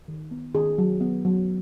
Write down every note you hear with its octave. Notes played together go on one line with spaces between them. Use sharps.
D#3
B3
D#3 G#4
F#3
B3
F#3